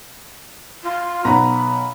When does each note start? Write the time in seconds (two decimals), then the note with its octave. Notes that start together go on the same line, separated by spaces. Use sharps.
0.83 F4
1.25 B1 B3 A#5 B5